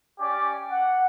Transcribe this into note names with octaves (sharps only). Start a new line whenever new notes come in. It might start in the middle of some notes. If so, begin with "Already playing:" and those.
C#4 G4 D5
F#5